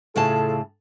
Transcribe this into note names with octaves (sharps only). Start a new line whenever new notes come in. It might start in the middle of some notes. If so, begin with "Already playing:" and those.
A2 C#3 F4 G#4 A4 A5